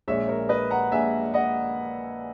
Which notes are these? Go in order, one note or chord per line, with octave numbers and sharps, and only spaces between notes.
A#1 A#2 G#3 C#5 E5
A#4 C#5
B4 D#5
F#5 A#5
A#1 A#2 G#3 E5 G#5
D#5 F#5